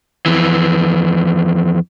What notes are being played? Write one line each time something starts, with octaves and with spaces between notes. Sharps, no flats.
F2 E3